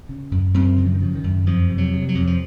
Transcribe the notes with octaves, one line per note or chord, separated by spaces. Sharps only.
C#3
F#2
F#2 C4
C#3
F3
D#3
C#3 F3
D#3
F#2
F2 F3
C3
F#3
C3
F#3
F2
F3